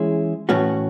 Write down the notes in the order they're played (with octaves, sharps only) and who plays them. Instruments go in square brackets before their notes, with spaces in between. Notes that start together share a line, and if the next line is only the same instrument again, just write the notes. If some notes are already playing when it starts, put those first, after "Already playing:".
Already playing: [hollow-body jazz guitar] E3 G#3 C#4 E4 G#4
A2 E3 A3 C#4 F#4